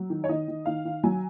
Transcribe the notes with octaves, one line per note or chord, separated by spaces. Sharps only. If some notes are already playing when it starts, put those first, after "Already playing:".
Already playing: F#3
D#3
C#5
D#3 D#5
D#3
D#3 F5
D#3
F#3 G#5